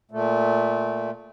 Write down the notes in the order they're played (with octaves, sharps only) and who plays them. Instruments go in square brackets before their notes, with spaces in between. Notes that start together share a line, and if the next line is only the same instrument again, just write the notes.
[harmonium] A#2 A3